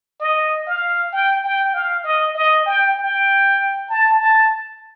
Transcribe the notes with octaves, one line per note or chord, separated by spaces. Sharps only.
D#5
F5
G5
G5
F5
D#5
D#5
G5
G5
A5
A5